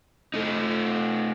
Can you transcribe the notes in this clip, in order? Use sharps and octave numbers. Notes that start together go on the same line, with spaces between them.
A3 D#4